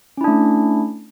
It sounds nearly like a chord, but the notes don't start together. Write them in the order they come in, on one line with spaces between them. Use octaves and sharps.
C#4 E4 D4 A3